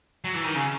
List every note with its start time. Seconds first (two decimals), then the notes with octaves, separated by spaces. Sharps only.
0.24 F#3
0.34 E3
0.44 D#3
0.55 C#3